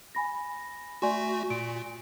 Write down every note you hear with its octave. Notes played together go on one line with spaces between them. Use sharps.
G#5 B5 A#6
A3 F#4 D5 G#5 C6
A#2 D7